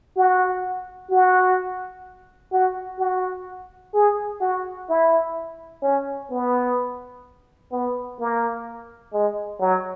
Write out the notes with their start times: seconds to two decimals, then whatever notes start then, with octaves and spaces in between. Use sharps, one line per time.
0.16 F#4
1.10 F#4
2.53 F#4
2.99 F#4
3.94 G#4
4.41 F#4
4.89 E4
5.82 C#4
6.30 B3
7.72 B3
8.20 A#3
9.13 G#3
9.60 F#3